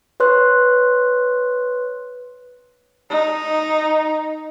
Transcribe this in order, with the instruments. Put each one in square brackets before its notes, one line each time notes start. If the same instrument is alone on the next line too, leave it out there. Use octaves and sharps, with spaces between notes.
[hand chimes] B4 C#5 C6 F#6
[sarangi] D#4